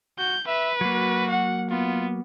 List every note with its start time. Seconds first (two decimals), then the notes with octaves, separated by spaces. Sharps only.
0.19 F#4 G6
0.47 B4 E5
0.81 F#3 A#3 F#4
1.30 F#5
1.70 B3 F4